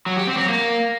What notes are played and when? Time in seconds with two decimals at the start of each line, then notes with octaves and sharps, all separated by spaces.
0.06 F#3
0.17 G4
0.27 C4
0.38 F#3
0.48 A#3